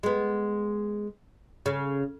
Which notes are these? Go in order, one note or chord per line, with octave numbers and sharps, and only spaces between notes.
G#3 B3
C#3